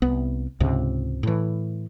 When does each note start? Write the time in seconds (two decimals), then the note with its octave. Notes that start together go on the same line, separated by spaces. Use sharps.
0.02 C2 B3
0.60 C#2 G#2 C3
1.23 A2 E3